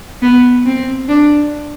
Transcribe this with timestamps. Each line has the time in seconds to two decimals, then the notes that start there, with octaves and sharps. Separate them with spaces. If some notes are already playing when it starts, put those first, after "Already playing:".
0.22 B3
0.66 C4
1.09 D4